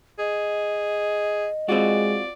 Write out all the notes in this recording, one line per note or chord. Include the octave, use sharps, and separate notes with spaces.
G#4 D#5
G#3 C4 F4 F#4 D5